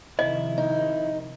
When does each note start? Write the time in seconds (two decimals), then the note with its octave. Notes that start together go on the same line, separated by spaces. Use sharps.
0.19 C3 D#3 F3 E4 D#5
0.58 D#4